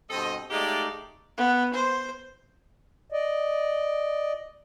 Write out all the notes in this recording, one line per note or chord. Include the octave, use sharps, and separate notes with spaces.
G2 B2 C4 A4 D#5
G#3 A3 D#4 G4 D5 F5
B3
C5
D5 D#5